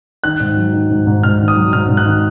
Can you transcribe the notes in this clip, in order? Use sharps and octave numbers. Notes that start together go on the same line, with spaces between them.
D#3 F#6
G#2
F#3
D#3
G#2
G#2
G#2 F6
D#3
D#6
F#3
G#2 F6
G#2
F#6
D#3